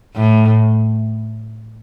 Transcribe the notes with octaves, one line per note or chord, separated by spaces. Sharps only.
A2